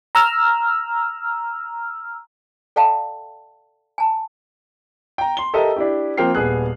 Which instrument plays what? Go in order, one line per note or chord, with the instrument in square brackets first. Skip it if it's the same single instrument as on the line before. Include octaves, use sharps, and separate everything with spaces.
[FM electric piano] A#5 E6 F6
[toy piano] A4 D5 E5 F5 G5 A5
G#5 A5
[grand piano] G5 A#5
C6 G7
G4 A4 A#4 D#5 E5
D4 E4 G4
F3 A#3 C4 G5 F6 C7
D#1 B3 G#4 F#6